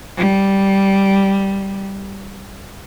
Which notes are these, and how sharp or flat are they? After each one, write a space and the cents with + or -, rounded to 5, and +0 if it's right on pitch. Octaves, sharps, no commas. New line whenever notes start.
G3 -5